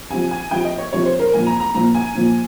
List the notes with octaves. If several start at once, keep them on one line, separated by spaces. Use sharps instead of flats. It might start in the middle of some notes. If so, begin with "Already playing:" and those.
C3 F3 G#5
G#5
C3 F3 G5
D#5
C#5
C3 F3 C#5
C5
A#4
A#2 F3 G#5
A#5
A#5
A#2 F3 A#5
G#5
A#2 F3